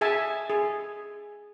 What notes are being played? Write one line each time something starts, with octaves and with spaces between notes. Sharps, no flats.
G#4 E5 G#5 A5
G#4